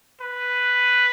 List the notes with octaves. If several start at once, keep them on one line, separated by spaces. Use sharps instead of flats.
B4